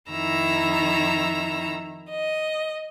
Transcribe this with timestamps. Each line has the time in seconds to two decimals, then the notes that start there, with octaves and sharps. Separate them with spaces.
0.11 F2 D#3 E4 A#5 E6
2.11 D#5